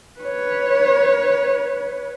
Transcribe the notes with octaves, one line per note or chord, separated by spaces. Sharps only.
B4 C#5